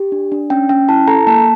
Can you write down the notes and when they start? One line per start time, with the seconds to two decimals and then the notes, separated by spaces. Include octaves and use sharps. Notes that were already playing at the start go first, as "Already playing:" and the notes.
Already playing: G4
0.12 D4
0.32 D4
0.50 C#4 G5
0.69 C#4 G5
0.89 E4 A5
1.07 A4 A#5
1.27 A#3 A5